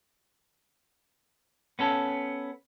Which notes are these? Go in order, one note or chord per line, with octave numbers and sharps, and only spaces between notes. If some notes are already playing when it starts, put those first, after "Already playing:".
B3 C#4 A4